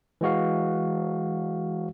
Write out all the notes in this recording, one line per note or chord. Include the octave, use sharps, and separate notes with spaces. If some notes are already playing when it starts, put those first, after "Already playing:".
E3 G#3 F#4 F5